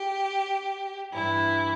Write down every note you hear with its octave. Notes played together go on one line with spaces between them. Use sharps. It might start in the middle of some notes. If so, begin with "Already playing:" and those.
Already playing: G4
G2 E3 E4